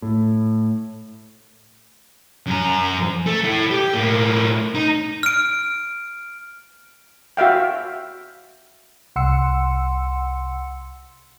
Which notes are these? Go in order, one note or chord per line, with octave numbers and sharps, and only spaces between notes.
A2
F#2 A#5
A3
A3 E4
G4
A2 A#3
D#4
F6 D7
F#4 E5 F5 G5
C2 F#5 C6 E6 C#7